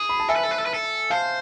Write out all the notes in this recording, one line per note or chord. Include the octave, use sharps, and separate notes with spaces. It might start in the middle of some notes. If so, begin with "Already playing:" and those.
Already playing: G#4
B5
A5
A4 E5 G#5
B4
A4
B4
A4
B4
A4
C5 F5 A5